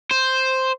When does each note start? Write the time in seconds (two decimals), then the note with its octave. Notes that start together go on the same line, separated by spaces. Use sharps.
0.11 C5